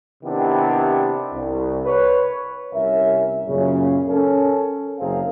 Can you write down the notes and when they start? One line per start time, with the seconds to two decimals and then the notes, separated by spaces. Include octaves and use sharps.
0.24 C3 D#3 B3 D4 E4 G4
1.33 C2
1.85 B4 C#5
2.73 C2 C#4 A#4 E5
3.47 F#2 A#2 C#3
4.08 C#4 A4 A#4
4.98 F#1 C4 G#4 A#4 F5